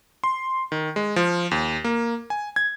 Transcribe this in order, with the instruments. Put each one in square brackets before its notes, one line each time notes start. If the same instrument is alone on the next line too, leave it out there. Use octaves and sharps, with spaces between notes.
[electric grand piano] C6
D#3
G#3
F3
D#2
A#3
G#5
G#6